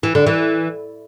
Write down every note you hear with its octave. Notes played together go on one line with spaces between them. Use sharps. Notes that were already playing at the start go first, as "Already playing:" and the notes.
E3
D3
E3